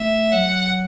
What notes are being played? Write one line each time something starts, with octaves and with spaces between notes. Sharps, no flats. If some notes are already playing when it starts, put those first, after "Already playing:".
Already playing: A3 E5
F#3 F#5